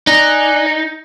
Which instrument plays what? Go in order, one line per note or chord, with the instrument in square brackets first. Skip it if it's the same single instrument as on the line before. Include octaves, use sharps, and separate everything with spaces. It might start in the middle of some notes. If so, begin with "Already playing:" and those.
[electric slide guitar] D#4 [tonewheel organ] D5 G#5 F#6